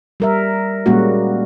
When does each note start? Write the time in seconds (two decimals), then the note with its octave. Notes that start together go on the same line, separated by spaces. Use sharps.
0.20 G3 A#4 E5
0.86 A#2 G3 G#3 A#3 C#4 F#4